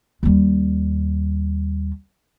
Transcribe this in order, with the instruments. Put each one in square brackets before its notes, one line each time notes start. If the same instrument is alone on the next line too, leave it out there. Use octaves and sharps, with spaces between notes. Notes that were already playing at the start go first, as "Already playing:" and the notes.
[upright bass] D#2 G3